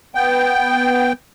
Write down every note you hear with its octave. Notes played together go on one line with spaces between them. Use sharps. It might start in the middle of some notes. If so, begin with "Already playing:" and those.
B3 G5